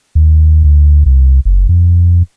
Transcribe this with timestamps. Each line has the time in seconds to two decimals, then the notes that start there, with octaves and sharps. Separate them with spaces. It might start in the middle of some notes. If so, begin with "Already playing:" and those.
0.15 D#2
0.64 D2
1.06 C2
1.45 F#1
1.69 F2